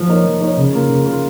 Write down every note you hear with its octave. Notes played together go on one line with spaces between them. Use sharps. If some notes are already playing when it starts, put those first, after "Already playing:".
Already playing: F3
A#3 D#4 A#4 C#5
F3
A#3 D#4 A#4 C#5
C#3
A#3 F4
C#3
A#3 F4